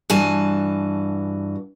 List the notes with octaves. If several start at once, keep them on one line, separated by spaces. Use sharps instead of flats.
G2 E3 F#4 G#5 A5